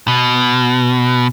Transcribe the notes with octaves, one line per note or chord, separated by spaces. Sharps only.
B2